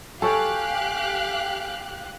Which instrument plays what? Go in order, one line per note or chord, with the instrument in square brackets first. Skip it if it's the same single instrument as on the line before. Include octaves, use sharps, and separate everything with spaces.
[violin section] G4 F5 F#6 [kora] A4 C#5 [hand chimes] G#5